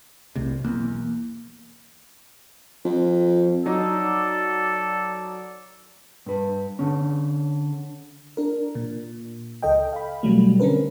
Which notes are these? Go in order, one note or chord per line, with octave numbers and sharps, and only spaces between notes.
F1 C2 A2 C3
B1 E2 A#3
F2
F#3 D#4 A4 D5
G2 B4
D3 C#4
D4 A#4
A#2
C#2 A4 D#5 G5
F5 B5
B2 F#3 G3 A3
D3 C4 C#4 A#4 B4